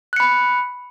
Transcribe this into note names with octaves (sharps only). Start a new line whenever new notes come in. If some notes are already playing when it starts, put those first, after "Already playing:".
B5 F#6 C#7